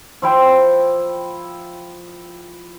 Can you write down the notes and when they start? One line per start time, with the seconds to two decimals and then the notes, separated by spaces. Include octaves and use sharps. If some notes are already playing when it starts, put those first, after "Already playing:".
0.22 F3 E4 G5